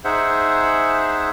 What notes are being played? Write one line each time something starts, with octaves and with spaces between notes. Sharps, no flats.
D#4 G#4 C5 E5 F#5